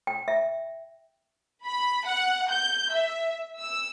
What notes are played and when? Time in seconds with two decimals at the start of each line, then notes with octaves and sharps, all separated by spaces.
0.07 G5
0.28 E5
1.66 B5
2.07 F#5
2.51 G6
2.93 E5
3.60 E6